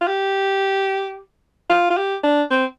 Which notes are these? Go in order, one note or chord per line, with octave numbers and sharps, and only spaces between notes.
F4
G4
F4
F4
G4
D4
C4